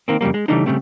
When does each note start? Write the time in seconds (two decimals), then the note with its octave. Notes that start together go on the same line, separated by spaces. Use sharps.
0.08 D#3 A#3 C4
0.21 F2 C#3 G3 A#3
0.34 G#3
0.48 C#3 E3 G3 A3 D4 D#4
0.66 C#3 F#3 G3 A3 C4